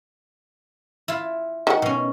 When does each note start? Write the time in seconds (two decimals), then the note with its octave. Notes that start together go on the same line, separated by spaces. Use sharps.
1.08 E4 F4
1.67 D#3 F#4 F#5
1.82 B2 C#4